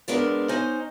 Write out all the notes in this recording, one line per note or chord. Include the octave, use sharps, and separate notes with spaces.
C#3 G#3 B3 D4 A#4
C#4 D#4 C5 D#5 G#5